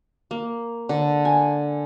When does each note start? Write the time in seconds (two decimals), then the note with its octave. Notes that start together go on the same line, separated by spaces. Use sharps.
0.31 A#3
0.89 D3
1.25 G#5